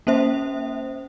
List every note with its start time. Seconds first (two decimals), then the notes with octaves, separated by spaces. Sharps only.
0.07 A#3 C#4 C5 E5